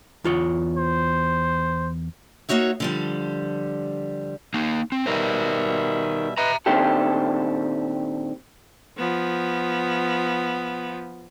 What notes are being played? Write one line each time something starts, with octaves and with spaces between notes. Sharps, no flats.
E2 F4 C#5
C5
A#3 D#4 F#4 C#5 E5
D3 F3 G3
A#3 D#4
C4
B2 G3 D#4 A#4 C5 E5
B4 D#5 E5 A#5
A#2 D#3 C4 D4 G4 A4
F3 B3